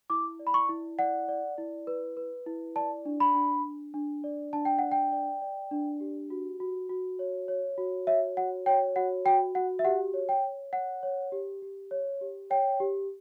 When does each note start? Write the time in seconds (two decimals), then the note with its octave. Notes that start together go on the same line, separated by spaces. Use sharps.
0.10 E4 D6
0.39 D5
0.47 B5
0.54 C#6
0.69 E4
0.99 D5 F#5
1.28 D5
1.58 E4
1.87 B4
2.17 B4
2.46 E4
2.76 D5 A5
3.05 D4
3.20 B5
3.34 D4
3.65 D4
3.94 D4
4.24 D5
4.53 D4 A5
4.65 G5
4.79 D5 F#5
4.92 G5
5.12 D5
5.42 D5
5.71 D4
6.00 G4
6.30 F#4
6.60 F#4
6.89 F#4
7.19 C#5
7.48 C#5
7.78 F#4
8.07 C#5 E5
8.37 F#4 F#5
8.66 C#5 G5
8.96 F#4 F#5
9.25 F#4 G5
9.55 F#4 F#5
9.79 E5
9.84 G4 F#5
10.14 C#5
10.29 G5
10.44 C#5
10.73 C#5 F#5
11.03 C#5
11.32 G4
11.62 G4
11.91 C#5
12.21 G4
12.50 C#5 G5
12.80 G4